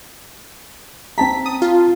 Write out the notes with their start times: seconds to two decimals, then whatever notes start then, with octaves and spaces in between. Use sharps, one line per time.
1.18 C4 A5 A#5 B6
1.46 D#6
1.62 F4